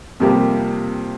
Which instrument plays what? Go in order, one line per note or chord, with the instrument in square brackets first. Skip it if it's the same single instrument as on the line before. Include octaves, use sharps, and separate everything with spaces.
[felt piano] F2 C3 G3 A#3 G4